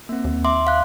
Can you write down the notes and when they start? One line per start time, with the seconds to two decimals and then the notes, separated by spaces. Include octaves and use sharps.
0.09 A#3 C4
0.24 D#2
0.44 E5 C6 D6
0.67 F5 F#6